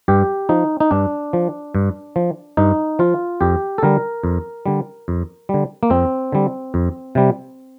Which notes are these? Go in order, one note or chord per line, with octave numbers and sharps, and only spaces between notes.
G2 G4
F3 D#4
D#4
G2 D4
F3
G2
F3
G2 D#4
F3 F4
F2 G4
A4
D3 G3 A#4
F2
D3 G3
F2
D3 G3
A#3
F2 C4
D3 G3
F2
C3 G3